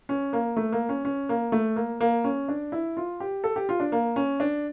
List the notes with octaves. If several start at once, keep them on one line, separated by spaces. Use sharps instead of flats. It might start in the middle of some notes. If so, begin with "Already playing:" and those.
C#4
A#3
A3
A#3
C#4
C#4
A#3
A3
A#3
A#3
C#4
D4
E4
F4
G4
A4
G4
F4
D4
A#3
C#4
D4